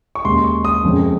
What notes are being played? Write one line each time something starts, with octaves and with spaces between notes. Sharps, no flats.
C#6
D#2 C#3 G#3 C6
C#6
D#6
F#1 F2 C#3 G#3